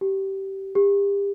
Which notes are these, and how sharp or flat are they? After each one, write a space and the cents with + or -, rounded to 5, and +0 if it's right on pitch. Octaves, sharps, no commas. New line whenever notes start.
G4 -20
G4 +35